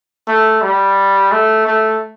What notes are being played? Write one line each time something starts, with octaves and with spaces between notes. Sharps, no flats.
A3
G3
A3
A3